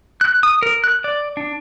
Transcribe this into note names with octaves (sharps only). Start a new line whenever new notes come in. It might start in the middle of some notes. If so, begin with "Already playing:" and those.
F#6
D#6
A#4
F#6
D5
D4